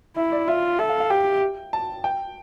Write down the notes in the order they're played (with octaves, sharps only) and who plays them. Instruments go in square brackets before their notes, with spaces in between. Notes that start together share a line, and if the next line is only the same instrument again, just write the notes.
[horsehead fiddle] E4 [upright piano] E5
[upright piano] D5
[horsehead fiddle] F4 [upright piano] E5
[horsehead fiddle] A4 [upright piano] E5
[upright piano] F5
F5
[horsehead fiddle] G4 [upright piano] G5
[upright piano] A5
G5